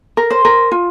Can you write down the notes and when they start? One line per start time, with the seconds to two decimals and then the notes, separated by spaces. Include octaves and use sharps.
0.17 A#4
0.30 C5
0.45 A#4
0.71 F4